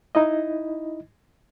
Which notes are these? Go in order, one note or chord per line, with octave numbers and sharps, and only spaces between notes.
D#4 E4 D#5